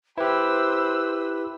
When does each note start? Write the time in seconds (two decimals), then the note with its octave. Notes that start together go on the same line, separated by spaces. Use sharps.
0.18 E4 G4 B4 C5 E6